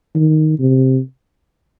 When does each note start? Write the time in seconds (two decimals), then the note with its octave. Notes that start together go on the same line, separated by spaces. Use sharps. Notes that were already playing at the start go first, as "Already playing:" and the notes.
0.15 D#3
0.59 C3